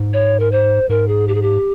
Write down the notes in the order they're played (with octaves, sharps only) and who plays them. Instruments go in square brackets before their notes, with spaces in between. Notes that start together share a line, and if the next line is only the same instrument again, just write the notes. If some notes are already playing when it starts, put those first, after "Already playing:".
Already playing: [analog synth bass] G#2
[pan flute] C#5
A#4
C5
[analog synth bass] G#2 [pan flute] A#4
[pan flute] G#4
G4
G#4
G4